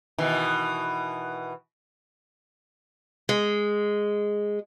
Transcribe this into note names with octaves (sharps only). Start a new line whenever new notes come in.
B2 D#3 E3
G#3